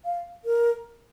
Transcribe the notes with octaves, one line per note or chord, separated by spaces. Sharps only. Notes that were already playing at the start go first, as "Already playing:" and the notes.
F5
A#4